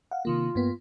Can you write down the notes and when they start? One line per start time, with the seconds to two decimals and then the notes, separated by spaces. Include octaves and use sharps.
0.11 F5 F#5
0.25 C3 D#3 A#3 F4
0.55 G2 A#3 B3